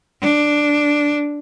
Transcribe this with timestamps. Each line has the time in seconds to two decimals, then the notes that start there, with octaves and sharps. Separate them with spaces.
0.22 D4